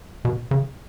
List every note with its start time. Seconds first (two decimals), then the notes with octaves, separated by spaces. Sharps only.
0.25 B2
0.51 C#3